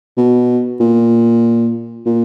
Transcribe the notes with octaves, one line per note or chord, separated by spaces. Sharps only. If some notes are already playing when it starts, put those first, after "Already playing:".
B2
A#2
A#2